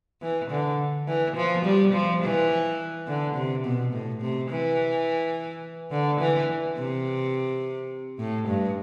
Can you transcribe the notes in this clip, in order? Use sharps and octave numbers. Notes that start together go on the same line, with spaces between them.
E3
D3
E3
F3
G3
F3
E3
D3
C3
B2
A2
C3
E3
D3
E3
C3
A2
G2